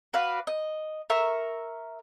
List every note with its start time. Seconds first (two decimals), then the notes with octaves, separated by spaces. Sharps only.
0.13 F#4 B4 D5 F5
0.47 D#5
1.10 A#4 E5 C#6